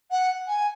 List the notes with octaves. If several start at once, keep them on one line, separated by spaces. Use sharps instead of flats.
F#5
G#5